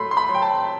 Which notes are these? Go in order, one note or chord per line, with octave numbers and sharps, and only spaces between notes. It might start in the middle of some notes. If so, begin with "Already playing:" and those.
Already playing: A2 F#3 A3 B5 C6
C6
B5
F#3
G5
A5